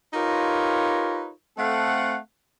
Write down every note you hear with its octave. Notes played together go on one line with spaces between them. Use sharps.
D#4 F4 G4 A#4 B4 C#5
A3 C4 A4 F5 F#5